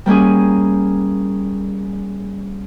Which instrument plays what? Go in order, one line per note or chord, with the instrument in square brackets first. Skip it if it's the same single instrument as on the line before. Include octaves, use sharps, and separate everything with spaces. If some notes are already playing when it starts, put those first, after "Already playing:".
[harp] G3 A#3 C#4 G#4